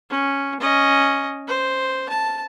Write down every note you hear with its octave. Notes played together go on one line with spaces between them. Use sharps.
C#4
C#4 D#5
C5
A5